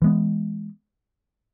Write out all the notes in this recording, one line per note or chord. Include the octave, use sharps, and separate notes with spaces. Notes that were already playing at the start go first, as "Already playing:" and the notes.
E3 G#3 B3